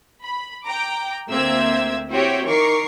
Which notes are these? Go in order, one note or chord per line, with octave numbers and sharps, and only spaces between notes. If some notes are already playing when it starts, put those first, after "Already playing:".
B5
G5 A#5 D6
D2 A#3 C4 E5 E6 G#6
C4 E4 F#4 G4 C#5 G5
D#3 A#4 C#6 D6 C7